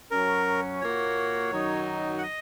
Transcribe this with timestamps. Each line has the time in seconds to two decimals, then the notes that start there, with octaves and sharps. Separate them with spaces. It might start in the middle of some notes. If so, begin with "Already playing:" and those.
0.11 F#2 F#3 C#4 A#4
0.81 A#2 A#3 F#4 C#5
1.52 F#2 D#3 F#3 D#4
2.18 F#5
2.23 D#5